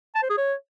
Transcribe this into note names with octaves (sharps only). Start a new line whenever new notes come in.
A5
C5
G#4
C#5